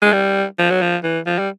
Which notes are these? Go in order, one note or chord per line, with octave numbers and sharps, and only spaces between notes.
G#3
G3
F3
F#3
F3
E3
F3
G3